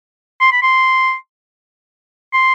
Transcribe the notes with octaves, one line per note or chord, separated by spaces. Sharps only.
C6
B5
C6
C6